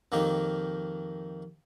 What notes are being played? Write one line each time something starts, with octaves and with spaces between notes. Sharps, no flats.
F2 D#3 A#3 D#4 G4